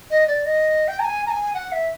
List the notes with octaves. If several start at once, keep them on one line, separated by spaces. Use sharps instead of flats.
D#5
D5
D#5
G5
A#5
G#5
A#5
G#5
F#5
E5